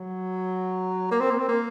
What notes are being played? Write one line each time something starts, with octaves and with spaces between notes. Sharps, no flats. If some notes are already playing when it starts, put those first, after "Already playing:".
Already playing: F#3
A#3
C4
A#3
C4
A#3